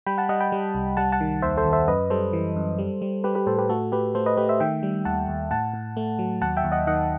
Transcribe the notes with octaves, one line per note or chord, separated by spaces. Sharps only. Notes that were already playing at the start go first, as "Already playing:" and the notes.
G3 G5 B5
F#5 A5
G3 D#5 F#5
G5 B5
G3
C2
G3 F#5 A5
F#5 A5
D#3
D#2 C5 E5
A4 C5
D#2
C5 E5
F#2 B4 D#5
G3 A4 C5
E3
F#2
G3
G3
G3 G4 B4
G4 B4
A2 A4 C5
G4 B4
A3 F#4 A4
A3 G4 B4
A3 A4 C5
B4 D#5
A3 G4 B4
C5 E5
D#3 E5 G5
G3
D#2 F#5 A5
D#2
A2 F#5 A5
A2
A3
F#3
D#2 F#5 A5
E5 G5
D#2
D#5 F#5
D#3 D#5 F#5